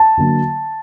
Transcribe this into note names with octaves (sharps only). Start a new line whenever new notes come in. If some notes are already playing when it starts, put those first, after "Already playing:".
Already playing: A5
D3 F#3 A#3